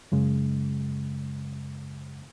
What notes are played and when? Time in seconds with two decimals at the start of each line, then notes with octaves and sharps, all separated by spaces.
0.12 F#2 C#3 G#3